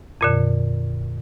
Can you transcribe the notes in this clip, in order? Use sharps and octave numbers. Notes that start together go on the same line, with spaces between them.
F2 A#2 D3